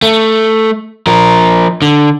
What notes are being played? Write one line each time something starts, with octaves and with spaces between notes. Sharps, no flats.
A3
F3 A#4
D3